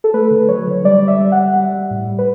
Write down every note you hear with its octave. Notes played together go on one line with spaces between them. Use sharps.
A4
A3 B4
D3
F#3 C#5
D3
G3 D5
G3
E5
G3
E5
F#5
G3
G3
G3
A2
G3
B4